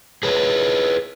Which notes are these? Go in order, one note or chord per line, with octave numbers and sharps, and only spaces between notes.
G#4 B4 C#5